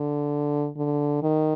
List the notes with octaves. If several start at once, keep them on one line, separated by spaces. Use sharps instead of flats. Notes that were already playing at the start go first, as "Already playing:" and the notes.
Already playing: D3
D3
D#3